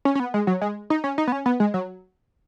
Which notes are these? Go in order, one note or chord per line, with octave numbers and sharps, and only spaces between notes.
C#4
C#4
B3
G#3
F#3
G#3
D#4
C#4
D#4
B3
C#4
B3
G#3
F#3